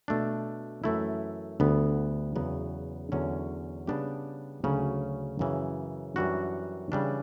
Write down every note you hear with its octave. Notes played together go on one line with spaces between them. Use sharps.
B2 A3 D4
F#2 E3 A3 E4
D2 D3 G3 B3
E2 C#3 F#3 B3
E2 D3 F#3 C#4
C#3 G3 B3 D4 G4
D2 C#3 F#3 C#4
F#2 C#3 E3
F#2 E3 G3 D4 F#4
C#3 E3 G3 D4